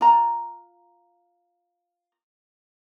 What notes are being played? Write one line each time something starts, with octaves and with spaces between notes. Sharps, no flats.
F4 A#5